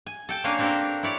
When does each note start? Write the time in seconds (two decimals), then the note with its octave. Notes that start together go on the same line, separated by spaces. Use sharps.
0.06 G#5
0.29 A4 G5 A5
0.44 A#3 C#4 D4 F5 G#5
0.59 C4 D4 G4 A4 A#4
1.03 E4 C#5 D5